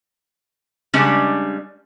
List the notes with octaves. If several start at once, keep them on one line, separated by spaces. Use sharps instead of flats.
C#3 G3 G#3 C#4 D4 B4